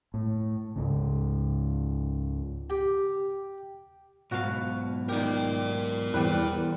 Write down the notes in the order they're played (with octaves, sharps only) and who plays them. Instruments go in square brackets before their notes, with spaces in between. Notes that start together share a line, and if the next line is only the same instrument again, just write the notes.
[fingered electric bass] A2
C#2 G#2 C#3
[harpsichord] G4
[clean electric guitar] B1 G#2 B2 [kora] F#4 F5
[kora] D#3 G4 [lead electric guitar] A#4 D5
[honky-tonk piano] E2 [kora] G3 C4 B4